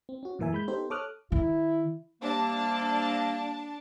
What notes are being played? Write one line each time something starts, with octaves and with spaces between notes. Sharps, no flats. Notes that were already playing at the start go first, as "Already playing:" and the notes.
C4
C#4 F#4
F#2 A#2 E3 A#4 E5 G#5
G#3 B5 G6
B3 D#4 G4 A4 C5
A4 C#5 D6 D#6 F6 F#6
D#3 E4
C3 G3 A#3 D4 A5